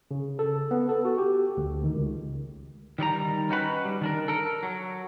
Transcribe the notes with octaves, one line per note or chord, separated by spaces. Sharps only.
C#3
A4
B3
A4
F#4
G4
D2
D#3
C#2
D#3 G3 D5 A#5
C#4 D#4 F#4 B4
G3
D#3 D4 A#4
A4 A#4
F#3